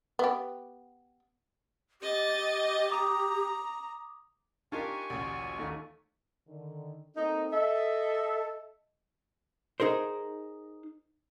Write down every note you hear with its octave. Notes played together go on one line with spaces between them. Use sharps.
B3 G4
G4 D#5 A6
A#5 D6 D#6
D4 D#4 F4 G4 A#4 G#5 C#6
A1 D2 A#2
D#2 A3
D3 D#3
A#3 C4 D#4 A4
A4 D#5 E5
D#4 G#4 A#4 C5